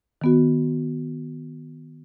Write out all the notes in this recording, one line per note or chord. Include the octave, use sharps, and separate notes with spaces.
D#3 B3 F#4